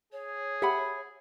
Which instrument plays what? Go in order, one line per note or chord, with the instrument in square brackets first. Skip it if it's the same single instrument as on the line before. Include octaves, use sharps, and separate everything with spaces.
[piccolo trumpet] G#4 [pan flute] C#5
[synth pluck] G4 [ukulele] E5 F#5 B5